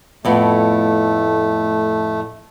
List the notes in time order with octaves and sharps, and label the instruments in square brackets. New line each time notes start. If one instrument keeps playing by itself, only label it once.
[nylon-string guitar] F2 A2 B3 [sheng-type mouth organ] A3